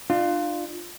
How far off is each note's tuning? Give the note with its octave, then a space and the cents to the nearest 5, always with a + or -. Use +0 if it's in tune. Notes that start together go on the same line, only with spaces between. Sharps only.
D4 +40 F4 +0